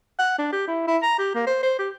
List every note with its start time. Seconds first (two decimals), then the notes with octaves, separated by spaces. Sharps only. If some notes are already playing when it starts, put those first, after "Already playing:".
0.19 F#5
0.38 D4
0.53 G4
0.68 E4
0.88 E4
1.02 A#5
1.19 G4
1.35 A#3
1.47 C5
1.63 C5
1.79 G4